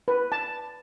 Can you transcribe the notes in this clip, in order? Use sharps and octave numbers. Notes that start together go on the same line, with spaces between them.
B4
A5